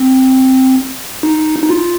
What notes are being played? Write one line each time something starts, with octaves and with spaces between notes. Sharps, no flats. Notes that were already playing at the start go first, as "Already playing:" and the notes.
Already playing: C4
D#4
D#4
F4